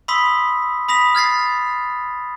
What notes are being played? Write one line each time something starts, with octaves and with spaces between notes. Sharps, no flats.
B5 C6 D#6 E6 B6
B5 D#6 A#6 B6 F7
F6 G#6 A6 C7